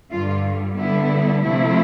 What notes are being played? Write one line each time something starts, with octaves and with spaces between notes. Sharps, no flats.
G2 D3 G3 F4
D3 G3 B3 E4
C3 F3 A3 E4